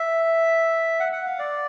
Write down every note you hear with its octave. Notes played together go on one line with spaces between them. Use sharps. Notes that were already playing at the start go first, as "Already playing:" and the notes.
Already playing: E5
F#5
F#5
F5
D5